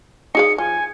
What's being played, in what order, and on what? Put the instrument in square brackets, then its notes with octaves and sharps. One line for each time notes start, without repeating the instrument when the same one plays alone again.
[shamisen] D#4 G#4 F5 [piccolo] C#7
[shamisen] F3 [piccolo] G#5